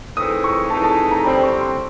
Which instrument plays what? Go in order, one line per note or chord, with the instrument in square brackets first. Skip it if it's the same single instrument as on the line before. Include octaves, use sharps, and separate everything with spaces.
[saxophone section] E3 A3 C4 D#4 G#4 [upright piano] D#6
[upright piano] C#6
[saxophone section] E3 A3 C4 D#4 G#4 [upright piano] A5
[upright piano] A5
A#5
[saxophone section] D3 G3 C4 [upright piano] B5
[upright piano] C#6
C6